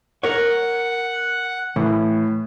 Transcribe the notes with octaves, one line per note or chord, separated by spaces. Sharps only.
A#4 C#5 F#5
A2 E3